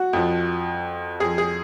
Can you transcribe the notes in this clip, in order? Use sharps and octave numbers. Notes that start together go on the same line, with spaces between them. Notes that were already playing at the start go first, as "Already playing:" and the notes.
Already playing: F#4
F2 F3
F2 F3 G#4
G#4